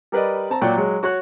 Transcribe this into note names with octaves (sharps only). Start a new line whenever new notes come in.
G3 A#4 B4 D5 D#5
C4 A5 A#5
A#2 F#3 D5 G5 C#6
F#3 G#3
F#4 C#5 C#6 F#6